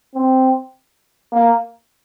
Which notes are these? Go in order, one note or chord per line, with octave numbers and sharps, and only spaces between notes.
C4
A#3